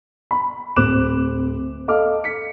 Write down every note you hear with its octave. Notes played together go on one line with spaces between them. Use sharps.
B5
D1 C4 D6 F#6 E7
A4 D#5 F5 D6 F6
B6 C#7